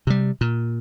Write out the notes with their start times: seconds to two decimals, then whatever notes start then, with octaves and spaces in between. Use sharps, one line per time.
0.07 C3 G3
0.41 A#2